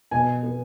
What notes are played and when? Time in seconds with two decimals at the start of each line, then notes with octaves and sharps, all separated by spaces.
0.11 B2 G#5
0.43 B3